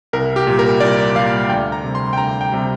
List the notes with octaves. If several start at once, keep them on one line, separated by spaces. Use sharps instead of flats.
C2 A#4
G4
A#2 G3
A#4
C2 D5
A#2 G3 F5
D2 G5
A#5
C3 G3
C6
G5
D2 A#5
G5
C3 G3